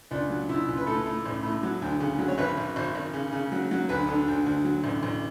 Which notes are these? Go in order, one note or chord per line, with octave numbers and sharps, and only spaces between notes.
C#2 D4
F#3
C#2 E4
C#2
B4
A2 A4
A2
A1
A2
F#3
D2
C#3
F#3
C#5
G#1 B4
G#1
G#1
G#1
C#3
C#3
F#3
F#3
D2 B4
D3
D2
D2
F#3
A1
A1